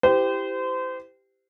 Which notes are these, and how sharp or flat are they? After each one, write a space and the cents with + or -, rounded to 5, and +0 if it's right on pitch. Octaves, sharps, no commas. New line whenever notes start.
E4 +0 G4 +0 C5 -30